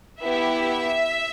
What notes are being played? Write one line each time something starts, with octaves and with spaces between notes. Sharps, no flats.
B3 E4 G4 E5